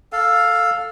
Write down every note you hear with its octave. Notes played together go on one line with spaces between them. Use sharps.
A4 F5